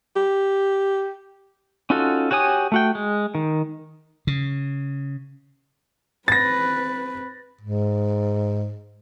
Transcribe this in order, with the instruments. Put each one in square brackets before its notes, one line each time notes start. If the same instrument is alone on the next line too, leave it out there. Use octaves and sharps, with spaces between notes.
[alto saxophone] G4
[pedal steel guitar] C#4 D#4 F4 F#4 A4
F#4 G4 C#5 G#5 D#6
A3 F#4 G5
G#3
D#3
[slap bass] C#3
[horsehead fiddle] C4 B4 [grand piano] A6 A#6
[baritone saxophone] G#2